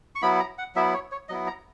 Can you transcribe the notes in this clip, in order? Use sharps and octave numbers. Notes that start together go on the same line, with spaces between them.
C#6
F#3 B3 E4 B5
A#5
F#5
F#3 B3 E4 E5
C#5
C#5
F#3 B3 E4 D#5
A#5